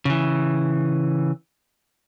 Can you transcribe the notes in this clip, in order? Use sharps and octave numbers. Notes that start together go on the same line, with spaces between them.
C#3 E3